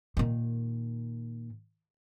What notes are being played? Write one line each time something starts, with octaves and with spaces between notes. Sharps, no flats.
A#2 D#3